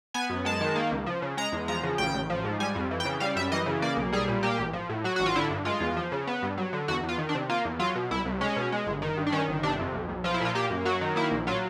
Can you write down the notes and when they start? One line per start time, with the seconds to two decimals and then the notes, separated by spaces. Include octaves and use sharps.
0.14 B3 G#5
0.30 F#2
0.45 G#3 A5
0.61 D#3
0.76 A#3
0.92 C#2
1.06 F3
1.22 C#3
1.37 G#3 A#5
1.52 E2
1.68 F3 A#5
1.83 C#3
1.98 A1 G5
2.14 A1
2.30 F3
2.44 G#2
2.60 G3 G#5
2.75 F2
2.91 E3
3.00 G5
3.05 C#3
3.20 G3 F5
3.36 F#2 E5
3.52 E3 D#5
3.66 C#3
3.82 A#3 D5
3.97 B1
4.12 G3 G#4
4.28 A#2
4.43 A#3 G4
4.58 A1
4.73 F3
4.89 A2
5.04 F#3 F#4
5.16 A1 F#4
5.26 F4
5.36 D3 E4
5.50 G2
5.65 G#3 F4
5.80 E2
5.97 F3
6.12 C#3
6.27 B3
6.42 G2
6.58 F#3
6.73 D3
6.88 E2 F#4
7.03 E2
7.09 F4
7.18 D#3
7.29 D4
7.35 C3
7.49 A#3 F4
7.65 E2
7.79 F#3 F4
7.95 B2
8.11 C2 E4
8.25 C2
8.41 G#3 C#4
8.56 B2
8.72 G#3
8.86 G1
9.02 D#3
9.17 G2
9.27 D4
9.32 D#3 C#4
9.48 G1
9.63 C3 D4
9.79 F2
9.94 B1
10.09 B1
10.24 F3 F4
10.34 E4
10.40 A#2 F4
10.55 A#3 G4
10.70 F#2
10.85 F#3 F#4
11.01 D#3
11.16 A#3 E4
11.31 A#1
11.47 F#3 F4